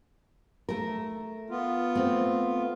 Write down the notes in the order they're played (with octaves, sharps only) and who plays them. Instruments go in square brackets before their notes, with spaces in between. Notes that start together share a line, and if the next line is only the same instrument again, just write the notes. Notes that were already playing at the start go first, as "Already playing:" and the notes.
[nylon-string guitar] A3 A#4
[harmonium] B3 F4
[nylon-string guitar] A3 C4